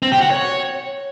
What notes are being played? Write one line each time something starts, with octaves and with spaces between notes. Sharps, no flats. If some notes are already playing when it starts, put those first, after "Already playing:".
C4
G4
F#4
C#5